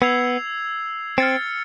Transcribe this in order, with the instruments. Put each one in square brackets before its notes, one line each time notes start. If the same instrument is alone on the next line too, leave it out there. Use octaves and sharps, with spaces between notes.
[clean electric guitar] B3 [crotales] E6 G#6 C7 F7
[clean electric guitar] C4 [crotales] F6 A6 C#7